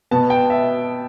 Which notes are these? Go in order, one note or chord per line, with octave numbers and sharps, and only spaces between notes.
B2 B3 A5
G5
E5